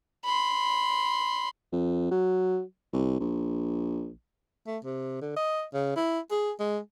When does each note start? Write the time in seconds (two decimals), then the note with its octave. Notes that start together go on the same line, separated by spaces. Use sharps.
0.25 B5 C6
1.72 F2
2.11 F#3
2.93 C2
3.20 A#1
4.67 A3
4.84 C3
5.21 D3
5.36 D#5
5.74 C#3
5.96 E4
6.31 G#4
6.59 G#3